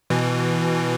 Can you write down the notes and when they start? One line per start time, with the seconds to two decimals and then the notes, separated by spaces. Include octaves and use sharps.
0.10 B2 E3